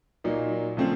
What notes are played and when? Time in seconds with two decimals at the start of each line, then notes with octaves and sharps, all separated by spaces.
0.24 A#2 F#3 A#3 D#4
0.77 C#3 F3 A3 C4